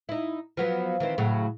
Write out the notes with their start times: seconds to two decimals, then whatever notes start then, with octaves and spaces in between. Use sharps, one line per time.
0.09 D#4 E4
0.57 F3 F#3 B3
1.00 D#3 E3 C4
1.18 A2 C#3 F#3